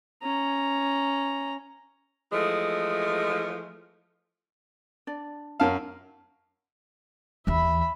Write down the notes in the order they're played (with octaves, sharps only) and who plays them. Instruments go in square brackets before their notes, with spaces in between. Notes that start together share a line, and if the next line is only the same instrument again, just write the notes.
[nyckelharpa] C#4 A#5
[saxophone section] E3 F3 G#3 A3
[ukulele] D4 D5
[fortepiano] F#2 F5 [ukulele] A#4 A5
[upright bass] D#2 E3 [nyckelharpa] E5 B5